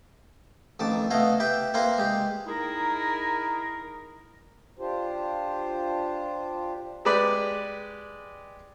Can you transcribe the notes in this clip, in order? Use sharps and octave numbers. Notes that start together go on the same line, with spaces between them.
A1 F2 D#3 A5 D6
A3 B3 E4 D#5 F5
G4 B4 E5 G5
A#3 C4 E4 A#4 B4 C6
G#3 G4
D#4 E4 G#4 A#4
D4 F4 G4 C5
G#3 G4 B4 D5